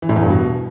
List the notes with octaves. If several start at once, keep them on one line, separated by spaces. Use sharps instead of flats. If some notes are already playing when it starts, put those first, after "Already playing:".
E3
A2
E2
G2
B2